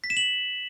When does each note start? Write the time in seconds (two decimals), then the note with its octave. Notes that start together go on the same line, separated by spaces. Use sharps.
0.04 B6
0.10 E7
0.17 F#7